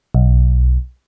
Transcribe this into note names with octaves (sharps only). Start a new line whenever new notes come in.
B1